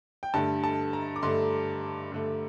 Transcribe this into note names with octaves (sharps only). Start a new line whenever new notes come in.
G5
G2 D3 A3 A5
A5
A#5
D6
G2 D3 A3 C6
G2 D3 A3